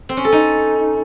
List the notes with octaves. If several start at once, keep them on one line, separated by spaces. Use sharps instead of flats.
C4
C#4
A4
D#4